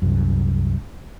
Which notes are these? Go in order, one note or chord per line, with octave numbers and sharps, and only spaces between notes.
C2 F#2